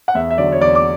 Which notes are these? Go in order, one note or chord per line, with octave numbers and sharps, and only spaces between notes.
F#5
E2 E5
E5
D3 F#3 D5
C#5
E2 D5
D6